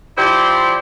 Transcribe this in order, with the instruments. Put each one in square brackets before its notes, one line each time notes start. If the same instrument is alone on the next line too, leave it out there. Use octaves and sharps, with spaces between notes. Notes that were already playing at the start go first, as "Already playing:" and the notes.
[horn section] F3 E4 G4 C5 D5 C6